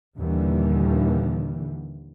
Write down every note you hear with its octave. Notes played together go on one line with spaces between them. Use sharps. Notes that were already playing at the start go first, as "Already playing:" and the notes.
D#2 A#2 D3 E3 G3